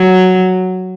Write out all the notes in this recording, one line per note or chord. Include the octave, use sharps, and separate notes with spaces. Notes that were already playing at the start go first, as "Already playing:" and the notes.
Already playing: F#3